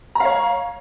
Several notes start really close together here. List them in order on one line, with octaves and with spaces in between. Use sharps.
A#5 F5 C#5